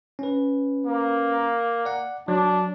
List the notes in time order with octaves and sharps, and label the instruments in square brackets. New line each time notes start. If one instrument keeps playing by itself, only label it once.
[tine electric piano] C#4 B4
[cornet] A#3
[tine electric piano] D5 F#5
[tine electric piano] F#3 [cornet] D4